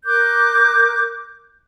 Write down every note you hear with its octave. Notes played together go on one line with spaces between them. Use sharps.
A#4 D6 F#6 G6